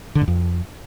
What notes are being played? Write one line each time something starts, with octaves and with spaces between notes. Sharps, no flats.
D3
G#2
F2